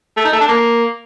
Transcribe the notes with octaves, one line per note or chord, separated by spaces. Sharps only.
A3
D#4
A3
D4
A#3